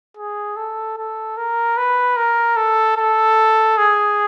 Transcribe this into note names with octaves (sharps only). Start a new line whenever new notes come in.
G#4
A4
A4
A#4
B4
A#4
A4
A4
G#4